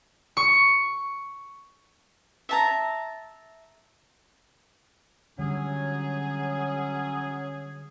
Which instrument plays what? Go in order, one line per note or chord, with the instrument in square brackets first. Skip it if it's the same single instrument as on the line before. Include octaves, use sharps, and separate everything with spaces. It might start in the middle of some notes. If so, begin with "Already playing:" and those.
[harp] C#6
[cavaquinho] E5 A5 A#5
[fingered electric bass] D3 G3 [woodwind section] F#3 C#4 G#4